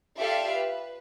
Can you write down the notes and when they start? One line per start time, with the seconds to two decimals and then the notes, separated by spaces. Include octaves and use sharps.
0.19 F4 G4 A4 D5 E5 F5
0.52 B4